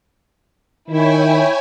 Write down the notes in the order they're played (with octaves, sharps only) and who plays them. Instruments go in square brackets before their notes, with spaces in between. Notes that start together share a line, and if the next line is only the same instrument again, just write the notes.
[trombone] D#3 [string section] E4 [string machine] C#5 G5 G#5